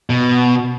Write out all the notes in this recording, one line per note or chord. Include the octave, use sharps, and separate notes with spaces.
B2